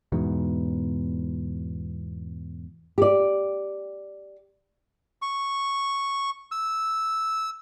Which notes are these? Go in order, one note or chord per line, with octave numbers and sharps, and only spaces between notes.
E2 G#2 B2
G4 D5
C#6
E6